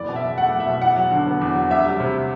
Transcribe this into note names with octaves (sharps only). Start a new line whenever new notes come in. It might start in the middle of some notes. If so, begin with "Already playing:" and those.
Already playing: F#1 E3 D5
B2
E5
E2
A3 F#5
F#1
E5
B2
E2 F#5
F#3
D3
B3
E2
F#3
D2 E5
G3
C3